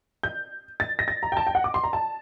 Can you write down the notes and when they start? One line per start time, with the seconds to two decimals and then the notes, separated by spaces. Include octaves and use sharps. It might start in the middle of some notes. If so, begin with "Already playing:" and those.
0.23 G6
0.80 A6
0.99 A#6
1.08 A6
1.23 A#5
1.32 G5
1.37 A5
1.47 G5
1.55 F#5
1.64 D6
1.74 C6
1.84 A#5
1.93 A5